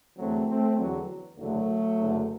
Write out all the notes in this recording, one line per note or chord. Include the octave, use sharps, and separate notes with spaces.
E2 D3 F#3 A3 C4
A3 C4
E2 D3 F#3
F#1 E2 D3 F#3 A3
F#1 F#2 D3